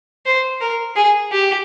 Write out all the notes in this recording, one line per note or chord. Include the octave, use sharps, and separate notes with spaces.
C5
A#4
G#4
G4